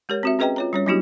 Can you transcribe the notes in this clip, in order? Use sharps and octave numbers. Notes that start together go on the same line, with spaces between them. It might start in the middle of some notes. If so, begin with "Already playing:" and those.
G#3 G4 A#4 C#5
C4 F#4 E5
C#4 G#4 B4 D#5 G5 A#5
F4 C#5 A#5
G3 C#4 C#5
F#3 A#3 D4 E4 F#4 G4